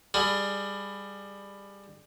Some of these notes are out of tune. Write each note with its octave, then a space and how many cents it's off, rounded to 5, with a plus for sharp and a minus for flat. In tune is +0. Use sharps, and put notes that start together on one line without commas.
G3 +20 G#4 +25